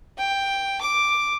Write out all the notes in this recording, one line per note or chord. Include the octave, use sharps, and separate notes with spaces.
G5
D6